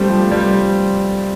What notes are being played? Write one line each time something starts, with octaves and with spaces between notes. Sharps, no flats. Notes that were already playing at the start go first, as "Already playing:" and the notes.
Already playing: G3 A3 C4 D4
F3
G3